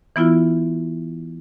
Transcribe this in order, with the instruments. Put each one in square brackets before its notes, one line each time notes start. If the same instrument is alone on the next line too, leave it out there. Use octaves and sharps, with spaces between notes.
[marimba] E3 B3 E4 F4